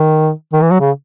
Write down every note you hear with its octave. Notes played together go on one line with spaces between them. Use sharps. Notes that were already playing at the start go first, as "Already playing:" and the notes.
Already playing: D#3
D#3
E3
F#3
C#3